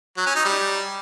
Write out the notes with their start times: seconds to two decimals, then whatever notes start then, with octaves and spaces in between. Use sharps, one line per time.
0.18 F#3
0.27 C#4
0.36 D#4
0.45 G3